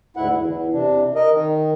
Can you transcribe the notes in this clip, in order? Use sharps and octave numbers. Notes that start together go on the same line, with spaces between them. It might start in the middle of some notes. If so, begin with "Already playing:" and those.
D2 G#2 E4 F#5
E2
C3 D4
A#4 D#5
D#3